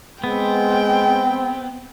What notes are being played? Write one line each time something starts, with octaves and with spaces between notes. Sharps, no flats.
G#3 B3 C4 G5